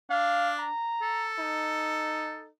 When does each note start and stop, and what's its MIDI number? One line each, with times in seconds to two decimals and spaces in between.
0.10 0.70 62
0.10 0.54 77
0.59 1.30 82
1.02 2.48 69
1.39 2.51 63